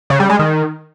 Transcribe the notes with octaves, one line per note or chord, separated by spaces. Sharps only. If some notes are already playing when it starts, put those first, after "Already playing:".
C#3
G3
G#3
D#3